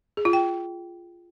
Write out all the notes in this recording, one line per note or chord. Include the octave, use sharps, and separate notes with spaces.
G#4
F4
G5